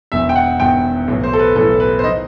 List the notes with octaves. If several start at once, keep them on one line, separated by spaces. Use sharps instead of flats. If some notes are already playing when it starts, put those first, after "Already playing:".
E1 E2 D#3 E5
G5
F#5
E1 E2 D#3 G5
B1 A2 E3
C5
A4
B4
B1 A2 E3 A4
B4
C5
D#3 D#5